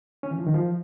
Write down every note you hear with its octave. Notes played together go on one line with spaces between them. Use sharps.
C#4
E3
F3
D#3
F3